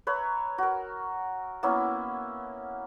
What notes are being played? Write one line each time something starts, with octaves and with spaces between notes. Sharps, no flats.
B4 C#5 E5 A#5
F#4 A#4
A#3 B3 C#4 E4